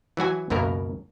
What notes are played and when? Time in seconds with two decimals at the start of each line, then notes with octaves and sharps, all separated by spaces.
0.17 E3 F#3 F#4 G#5
0.50 C#2 F#2 B2 A#3 A#4